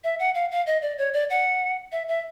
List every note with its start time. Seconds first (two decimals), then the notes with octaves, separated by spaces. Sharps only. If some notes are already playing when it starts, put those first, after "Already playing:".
0.04 E5
0.19 F#5
0.35 F5
0.51 F5
0.67 D#5
0.82 D5
0.98 C#5
1.13 D5
1.30 F#5
1.92 E5
2.08 E5